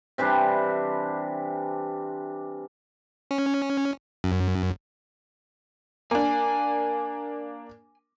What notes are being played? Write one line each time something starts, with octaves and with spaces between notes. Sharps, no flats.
C3 E3 G3 D4
C#4
F#2
A#3 D4 G#5